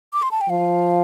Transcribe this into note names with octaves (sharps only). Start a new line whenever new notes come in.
D6
C6
A5
G5
F3 F5